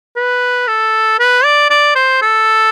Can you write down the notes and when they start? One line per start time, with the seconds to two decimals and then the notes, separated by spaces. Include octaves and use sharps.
0.16 B4
0.68 A4
1.20 B4
1.45 D5
1.70 D5
1.95 C5
2.22 A4